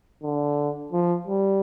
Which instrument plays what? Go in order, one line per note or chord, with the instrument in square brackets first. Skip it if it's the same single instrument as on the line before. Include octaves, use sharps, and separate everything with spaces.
[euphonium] D3
F3
G3